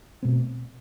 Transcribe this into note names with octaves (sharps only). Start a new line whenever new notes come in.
B2 A3 C4